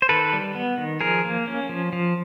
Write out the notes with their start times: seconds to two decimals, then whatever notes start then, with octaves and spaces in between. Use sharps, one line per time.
0.02 C5
0.09 D#3 A4 B4
0.33 G3
0.55 B3
0.78 D#3
1.01 F3 G#4 A#4
1.25 A#3
1.48 C#4
1.69 F3
1.93 F3